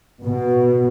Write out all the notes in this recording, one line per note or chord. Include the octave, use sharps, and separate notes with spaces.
B2